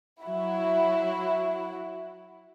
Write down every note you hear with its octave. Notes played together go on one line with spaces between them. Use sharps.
F#3 E4 F#4